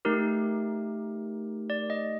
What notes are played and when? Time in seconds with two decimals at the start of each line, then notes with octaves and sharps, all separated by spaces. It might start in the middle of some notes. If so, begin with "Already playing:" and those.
0.05 A3 D#4 G4 A#4
1.70 D5
1.90 D#5